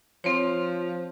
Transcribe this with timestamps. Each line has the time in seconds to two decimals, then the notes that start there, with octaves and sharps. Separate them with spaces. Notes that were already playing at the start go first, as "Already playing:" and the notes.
0.24 F3 C4 C5 C#5